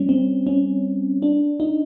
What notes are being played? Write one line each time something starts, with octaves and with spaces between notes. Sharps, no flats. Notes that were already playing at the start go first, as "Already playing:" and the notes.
Already playing: G3 C#4
C4
C#4
D4
D#4